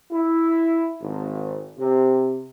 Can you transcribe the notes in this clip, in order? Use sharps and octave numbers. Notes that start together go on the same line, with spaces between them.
E4
G#1
C3